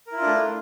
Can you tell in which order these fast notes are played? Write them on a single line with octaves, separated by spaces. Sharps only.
A#4 E4 F4 D4 A3